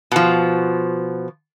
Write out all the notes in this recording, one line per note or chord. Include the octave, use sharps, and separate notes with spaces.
B2 F3